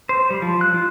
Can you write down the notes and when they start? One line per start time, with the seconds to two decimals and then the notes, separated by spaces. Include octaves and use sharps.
0.09 C5
0.31 G3
0.42 F3
0.61 F#6
0.74 F4